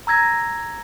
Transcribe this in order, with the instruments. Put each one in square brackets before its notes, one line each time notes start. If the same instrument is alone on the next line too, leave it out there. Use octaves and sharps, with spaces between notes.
[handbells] A#5 E6 G#6 A#6